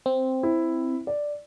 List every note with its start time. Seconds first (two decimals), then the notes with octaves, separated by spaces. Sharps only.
0.06 C4
0.43 E4
1.07 D5